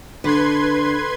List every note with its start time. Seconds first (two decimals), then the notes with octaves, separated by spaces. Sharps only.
0.24 D3 B4 C6 G#6